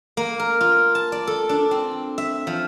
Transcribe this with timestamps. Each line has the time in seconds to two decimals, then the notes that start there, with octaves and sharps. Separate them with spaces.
0.17 A#3
0.40 A#4
0.61 F4
0.95 A5
1.12 D5
1.27 A4
1.49 D4
1.71 C4
2.18 E5
2.47 F3